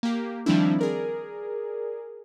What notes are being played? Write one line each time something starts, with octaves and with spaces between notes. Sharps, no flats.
A#3 G4
D#3 F3 G3 C4 D4 E4
G#4 A#4 D5